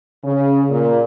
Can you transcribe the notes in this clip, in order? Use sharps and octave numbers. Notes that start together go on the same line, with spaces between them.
C#3
A#2